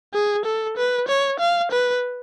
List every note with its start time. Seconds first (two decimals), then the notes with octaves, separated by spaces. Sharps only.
0.14 G#4
0.45 A4
0.77 B4
1.08 C#5
1.40 F5
1.72 B4